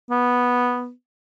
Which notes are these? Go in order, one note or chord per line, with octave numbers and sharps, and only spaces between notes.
B3